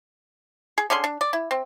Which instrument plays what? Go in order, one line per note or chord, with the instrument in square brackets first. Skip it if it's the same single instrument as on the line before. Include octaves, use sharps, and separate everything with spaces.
[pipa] G#4
D3 C#4 G#4 C6
D4
D5
E4
C4